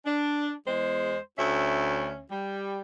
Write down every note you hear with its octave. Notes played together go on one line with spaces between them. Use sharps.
D4
E2 G#3 C5
D2 C#4 E5
G3